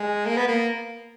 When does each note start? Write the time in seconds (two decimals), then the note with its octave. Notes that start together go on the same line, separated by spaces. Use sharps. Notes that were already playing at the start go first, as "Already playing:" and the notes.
Already playing: G#3
0.26 A#3
0.37 B3
0.48 A#3